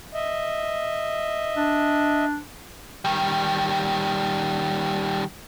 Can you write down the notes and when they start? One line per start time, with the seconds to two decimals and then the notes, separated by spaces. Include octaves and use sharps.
0.14 D#5 E5
1.56 D4
3.05 D#3 G3